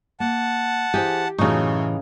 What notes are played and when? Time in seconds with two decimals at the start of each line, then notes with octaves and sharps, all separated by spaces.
0.20 A#3 F#5 A5
0.94 E3 G4 G#4 A#4 C5
1.38 F#2 A2 C#3 E3 A3 D#4 C#6